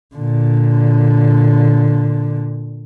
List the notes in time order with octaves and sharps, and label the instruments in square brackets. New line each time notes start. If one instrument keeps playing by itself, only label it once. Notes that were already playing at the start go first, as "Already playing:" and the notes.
[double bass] A#2 D3